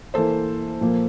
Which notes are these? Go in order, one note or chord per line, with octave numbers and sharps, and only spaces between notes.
E3 A#3 A4 C5
A#2 F3 A#3